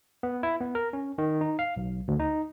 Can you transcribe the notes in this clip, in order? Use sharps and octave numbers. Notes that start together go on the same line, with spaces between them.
B3
E4
B3
A#4
C#4
D#3
D#4
F5
B1
D2
D#4